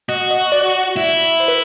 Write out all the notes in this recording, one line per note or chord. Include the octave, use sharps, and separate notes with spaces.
F#4 D#5
D#5
D5
E4
C5
B4